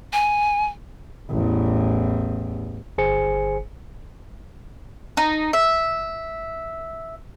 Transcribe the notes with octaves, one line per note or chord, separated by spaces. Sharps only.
G#5
A1 E2
G1 G#4 C5 G#5 C#7
D#4
E5